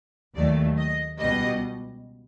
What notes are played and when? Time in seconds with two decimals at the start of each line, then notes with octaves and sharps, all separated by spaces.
0.35 D#2 D#3 F#3 A3 D5
0.77 D#5
1.19 C#2 B2 G3 D#5